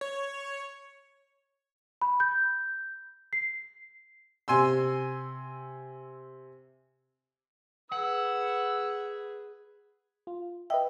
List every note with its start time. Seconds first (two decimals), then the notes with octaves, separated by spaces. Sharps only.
0.01 C#5
2.02 B5
2.20 G6
3.33 C7
4.48 C3 G#5 C6 E6
7.92 G#4 B4 F#5 E6
10.27 F4
10.70 B4 D#5 E5 G5